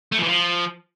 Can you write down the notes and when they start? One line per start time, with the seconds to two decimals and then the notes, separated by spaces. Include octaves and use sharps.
0.12 A3
0.17 F3
0.23 E3
0.28 F3